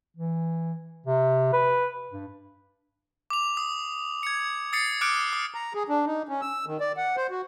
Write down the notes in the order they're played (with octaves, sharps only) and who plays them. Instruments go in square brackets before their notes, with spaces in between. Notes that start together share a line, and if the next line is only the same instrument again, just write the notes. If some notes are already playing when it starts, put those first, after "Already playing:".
[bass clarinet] E3
C3
B4
G2
[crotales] D6 F7
D#6
G#6 C#7
D#6 A6 C7 C#7
D6 F6 F#6 C#7 D7
D#6
[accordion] A#5
G#4
D4
D#4
C#4
E6
D#3
D5
F#5
C5
F#4